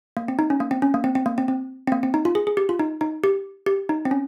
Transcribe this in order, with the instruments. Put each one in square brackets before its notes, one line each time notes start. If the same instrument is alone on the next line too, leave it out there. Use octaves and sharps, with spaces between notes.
[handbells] A#3
C4
D#4
C#4
A#3
C4
C#4
A#3
C4
C4
A#3
C4
C4
C4
A#3
C4
D#4
F4
G#4
G#4
G4
F4
D#4
D#4
G4
G4
D#4
C4
C#4